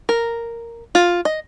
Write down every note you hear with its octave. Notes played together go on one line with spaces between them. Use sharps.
A#4
F4
D#5